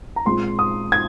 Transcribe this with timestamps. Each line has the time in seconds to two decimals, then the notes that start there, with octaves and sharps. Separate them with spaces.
0.16 A#5
0.25 A#2 G#3 C4 C6
0.59 D#6
0.92 G#6